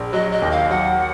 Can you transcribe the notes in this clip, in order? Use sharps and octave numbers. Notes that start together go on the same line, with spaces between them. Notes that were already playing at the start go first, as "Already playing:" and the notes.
Already playing: A#1
F#3 D#5
D#5
D#2
F5
F#3 F#5